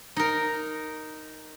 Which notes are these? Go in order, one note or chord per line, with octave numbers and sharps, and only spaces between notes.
D#4 A#4